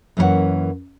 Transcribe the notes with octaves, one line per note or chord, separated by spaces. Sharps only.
F#2 E3 A#3 A#4 C#5 F#5